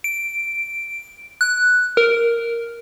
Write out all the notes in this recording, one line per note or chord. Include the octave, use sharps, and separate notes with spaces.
D7
F#6
A#4